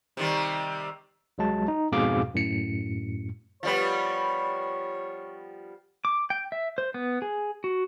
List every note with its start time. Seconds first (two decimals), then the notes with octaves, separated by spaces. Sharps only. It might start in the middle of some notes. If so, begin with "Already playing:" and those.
0.17 C3 D#3 G3
1.38 C2 F#3 G#3 A5
1.68 D#4
1.92 F2 G#2 B2 G#4 F5 D6
2.35 F#2 A2 C#7
3.63 F3 G3 B3 C#5
6.05 D6
6.30 G5
6.52 E5
6.78 C5
6.94 B3
7.22 G#4
7.64 F#4